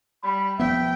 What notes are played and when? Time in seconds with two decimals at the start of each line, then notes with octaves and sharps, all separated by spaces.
0.24 G3 B5
0.59 E1 F3 B3 E5 G5